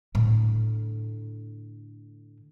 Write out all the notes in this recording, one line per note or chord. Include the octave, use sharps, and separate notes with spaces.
A2 D3